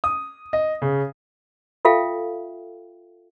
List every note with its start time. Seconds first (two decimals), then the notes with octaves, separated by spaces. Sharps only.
0.04 D#6
0.53 D#5
0.82 C#3
1.85 F4 A4 E5 F5 G5